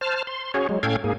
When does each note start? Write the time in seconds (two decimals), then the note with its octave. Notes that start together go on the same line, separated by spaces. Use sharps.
0.01 C5 A5 F6
0.27 C6
0.54 C#4 F#4 G#4 C#5
0.69 F#3 G#3
0.83 A2 C#4 A4 F5 G5 G#6
1.04 G#2 A#3 G#4